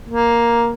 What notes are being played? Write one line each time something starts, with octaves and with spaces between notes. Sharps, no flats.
A#3